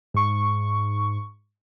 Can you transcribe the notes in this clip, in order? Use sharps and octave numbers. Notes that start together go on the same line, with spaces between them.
G#2 C#6